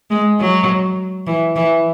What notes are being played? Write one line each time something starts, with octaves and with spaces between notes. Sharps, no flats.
G#3
F#3
E3
E3